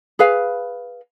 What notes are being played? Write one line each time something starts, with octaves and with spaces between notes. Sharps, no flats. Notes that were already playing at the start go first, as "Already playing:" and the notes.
G#4 B4 F5